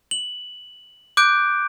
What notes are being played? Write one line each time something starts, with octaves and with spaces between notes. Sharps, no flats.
F#7
D6 F#6 G6 D7